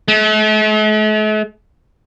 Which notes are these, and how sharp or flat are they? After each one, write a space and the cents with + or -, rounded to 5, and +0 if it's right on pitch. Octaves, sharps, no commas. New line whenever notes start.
A3 -45